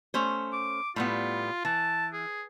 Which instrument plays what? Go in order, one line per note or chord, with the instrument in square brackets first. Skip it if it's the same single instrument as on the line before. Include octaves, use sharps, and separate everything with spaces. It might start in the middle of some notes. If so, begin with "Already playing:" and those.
[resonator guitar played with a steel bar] A3 C#4 C5
[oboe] D6
[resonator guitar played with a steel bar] A2 G3 B3 [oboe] F4
[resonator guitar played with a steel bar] E3 [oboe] A5
[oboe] G#4